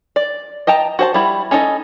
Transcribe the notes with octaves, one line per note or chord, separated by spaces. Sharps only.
D5
D#5 G5 A5 A#5
F#4 C5 A5
G3 E4
C#4 D#4 A4 D#5